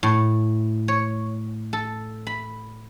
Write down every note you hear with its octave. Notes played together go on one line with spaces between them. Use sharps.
A2
C#5
A4
B5